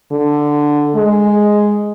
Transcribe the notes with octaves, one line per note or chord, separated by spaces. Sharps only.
D3
G#3